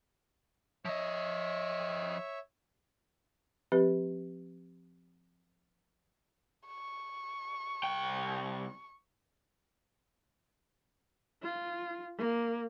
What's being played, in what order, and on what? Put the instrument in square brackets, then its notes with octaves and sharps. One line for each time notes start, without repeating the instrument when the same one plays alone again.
[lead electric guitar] F3 D#5 [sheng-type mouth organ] C#5 E5
[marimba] F3 C4 G4 B4
[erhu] C#6
[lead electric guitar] C2 G5
[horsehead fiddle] F4
A#3